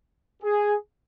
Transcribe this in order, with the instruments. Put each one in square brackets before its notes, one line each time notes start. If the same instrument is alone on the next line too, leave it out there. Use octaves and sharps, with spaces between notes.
[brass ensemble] G#4